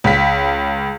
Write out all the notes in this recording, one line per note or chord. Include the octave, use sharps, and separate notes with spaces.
C#2 B6